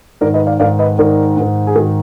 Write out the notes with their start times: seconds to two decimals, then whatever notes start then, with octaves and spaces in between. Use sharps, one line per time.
0.21 G#2 D#3 A#4 D5
0.34 B4 D#5
0.46 D5 F5
0.60 G#2 D#3 D5 F5
0.79 B4 D#5
0.98 G#2 D#3 A#4 D5
1.37 G#2 D#3
1.67 G#4
1.75 G#2 D#3 F#4